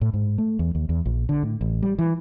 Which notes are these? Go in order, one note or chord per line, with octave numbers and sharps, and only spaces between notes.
A2
G#2
A3
E2
D#2
E2
A#1
D3
A2
A1
G3
E3